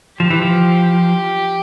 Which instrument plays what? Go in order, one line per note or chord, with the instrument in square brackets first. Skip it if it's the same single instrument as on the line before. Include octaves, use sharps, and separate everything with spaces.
[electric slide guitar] F3 [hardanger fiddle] G4
[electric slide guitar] E3
F3